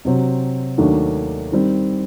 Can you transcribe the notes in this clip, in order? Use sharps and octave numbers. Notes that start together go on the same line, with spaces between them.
C3 F#3 C4
D#2 D#3 F#3 A3 D4
D#3 G3 C4